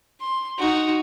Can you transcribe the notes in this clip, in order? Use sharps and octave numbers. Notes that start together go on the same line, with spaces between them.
C6
D#4 F#4